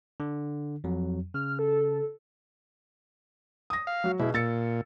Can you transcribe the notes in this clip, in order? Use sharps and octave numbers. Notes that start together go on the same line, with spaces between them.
D3
F2 F#3
C#3 F6
A4
D#6 A#6
F5
F#3 F#4
B2 E4 G#4
A#2 E6 A6 C#7